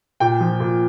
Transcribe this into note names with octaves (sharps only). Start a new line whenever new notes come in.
A#2 G5
F3
A#2